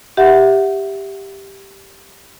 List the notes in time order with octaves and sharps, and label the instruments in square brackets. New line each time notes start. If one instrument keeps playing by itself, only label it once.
[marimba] G4 E5 F#5